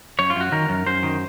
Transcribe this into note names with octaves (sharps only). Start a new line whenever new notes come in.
F#2 C#5
F4
F#2 F#4
D#3 A#4
F#2
F#2 C5
D#3